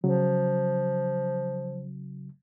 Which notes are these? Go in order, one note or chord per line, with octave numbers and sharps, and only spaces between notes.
C#3 F3 F#3